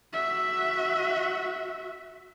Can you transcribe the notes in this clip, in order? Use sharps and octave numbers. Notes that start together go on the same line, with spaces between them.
F#4 E5